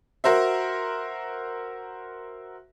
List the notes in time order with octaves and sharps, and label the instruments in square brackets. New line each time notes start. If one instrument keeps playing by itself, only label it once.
[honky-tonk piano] F#4 A#4 C5 E5